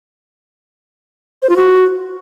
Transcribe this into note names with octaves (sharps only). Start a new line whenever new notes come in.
C5
F4
F#4